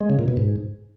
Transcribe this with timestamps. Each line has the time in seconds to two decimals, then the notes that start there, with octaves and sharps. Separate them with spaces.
0.01 G#3
0.10 C#3
0.19 A#2
0.28 B2
0.37 G#2